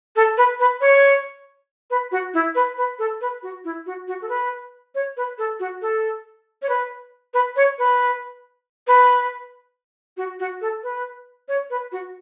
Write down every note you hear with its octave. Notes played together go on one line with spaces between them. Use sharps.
A4
B4
B4
C#5
B4
F#4
E4
B4
B4
A4
B4
F#4
E4
F#4
F#4
A4
B4
C#5
B4
A4
F#4
A4
C#5
B4
B4
C#5
B4
B4
F#4
F#4
A4
B4
C#5
B4
F#4